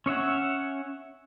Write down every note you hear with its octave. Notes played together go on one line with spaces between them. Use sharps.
C#4 C#5 E5 F#5